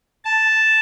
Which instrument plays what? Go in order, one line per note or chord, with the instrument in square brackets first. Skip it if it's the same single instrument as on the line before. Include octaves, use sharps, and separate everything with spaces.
[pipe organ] A5